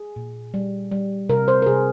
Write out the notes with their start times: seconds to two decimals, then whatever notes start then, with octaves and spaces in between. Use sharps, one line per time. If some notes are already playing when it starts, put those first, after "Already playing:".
Already playing: G#4
0.16 A#2
0.54 G3
0.91 G3
1.29 C3 A#4
1.48 C5
1.62 A#4
1.66 C3 G#4